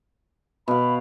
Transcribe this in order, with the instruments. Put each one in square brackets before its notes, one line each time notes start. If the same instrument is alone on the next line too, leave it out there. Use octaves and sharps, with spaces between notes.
[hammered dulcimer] B2 F5 [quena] B5